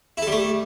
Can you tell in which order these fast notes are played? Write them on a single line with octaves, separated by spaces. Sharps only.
E4 A4 G3 A3